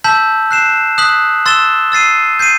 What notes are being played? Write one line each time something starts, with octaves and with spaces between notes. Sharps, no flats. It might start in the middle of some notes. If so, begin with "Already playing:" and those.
A5 E6 G6 B6 F#7
F#6 C7 E7
D#6 F#6 B6 F#7
C6 E6 A6 E7 G7
E6 A6 C7 D#7
G6 C7 D#7